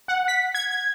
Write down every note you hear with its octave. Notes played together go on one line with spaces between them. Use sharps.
F#5
B6
G#6
G#6